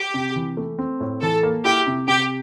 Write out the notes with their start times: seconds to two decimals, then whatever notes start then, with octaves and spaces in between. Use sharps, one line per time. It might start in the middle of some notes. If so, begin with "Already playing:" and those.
Already playing: G4
0.14 C3
0.36 E3
0.57 A3
0.79 C4
1.00 A2
1.21 E3 A4
1.43 A#3
1.65 E4 G4
1.87 C3
2.08 C3 G4